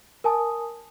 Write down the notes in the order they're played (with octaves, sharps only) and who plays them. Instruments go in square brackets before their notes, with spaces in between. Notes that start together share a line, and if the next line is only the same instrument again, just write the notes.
[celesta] A#4 G#5 A5 D#6